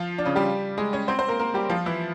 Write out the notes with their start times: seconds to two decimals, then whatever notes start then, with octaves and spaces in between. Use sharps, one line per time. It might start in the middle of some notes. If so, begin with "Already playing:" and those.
Already playing: F3 F4
0.18 D4
0.25 C#3 C#4
0.36 G3 G4
0.78 G#3 G#4
0.93 C#4 C#5
1.08 C4 C5
1.19 C4 C5
1.28 A#3 A#4
1.39 A#3 A#4
1.54 G3 G4
1.70 F3 F4
1.86 E3 E4